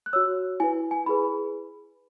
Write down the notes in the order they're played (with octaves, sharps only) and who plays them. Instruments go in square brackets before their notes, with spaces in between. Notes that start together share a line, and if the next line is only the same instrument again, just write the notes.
[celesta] F#6
F#4 C#5 E6
E4 B4 G#5
G#5
E4 G#4 B4 B5